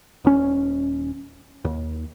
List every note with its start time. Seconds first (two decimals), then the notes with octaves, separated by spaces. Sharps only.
0.25 D#1 C#4
1.65 D#2